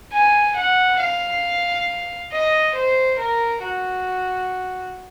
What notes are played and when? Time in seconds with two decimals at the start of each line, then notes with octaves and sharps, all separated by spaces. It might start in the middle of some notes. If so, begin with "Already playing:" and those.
0.13 G#5
0.56 F#5
1.00 F5
2.32 D#5
2.75 C5
3.19 A#4
3.63 F#4